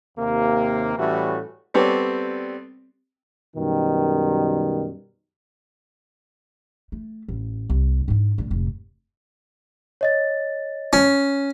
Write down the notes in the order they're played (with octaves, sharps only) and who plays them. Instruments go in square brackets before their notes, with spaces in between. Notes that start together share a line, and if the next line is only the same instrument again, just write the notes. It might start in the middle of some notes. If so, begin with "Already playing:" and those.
[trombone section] D#2 C3 A#3
A2 E3 G3 A3 C#4 F#4
[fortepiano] G3 B3 C4 A4 C#5 D5
[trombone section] F#2 B2 D#3 G3
[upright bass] A3
A1
C2
G#2 D4
A2 D3
F1 G#2
[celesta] C#5 D#5 A6
[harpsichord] C#4